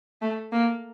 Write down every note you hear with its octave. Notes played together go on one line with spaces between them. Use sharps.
A3
A#3